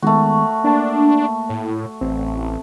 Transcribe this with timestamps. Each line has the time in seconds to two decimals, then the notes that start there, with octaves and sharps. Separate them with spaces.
0.03 D#3 G#3 A3 B3 F#4
0.64 A#3 D4 A5
1.49 A2
2.01 A1 C4